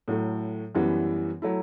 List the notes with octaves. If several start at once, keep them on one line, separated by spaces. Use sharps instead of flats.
A2 F#3 A3
F#2 E3 G3 B3
F#3 A3 E4